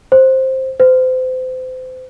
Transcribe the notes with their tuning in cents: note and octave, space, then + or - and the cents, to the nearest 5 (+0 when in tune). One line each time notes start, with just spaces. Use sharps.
C5 +10
C5 -30